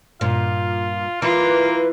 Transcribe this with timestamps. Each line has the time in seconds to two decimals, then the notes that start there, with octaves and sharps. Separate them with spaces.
0.21 G2 A#2 F4
1.22 E3 A#3 F4 B4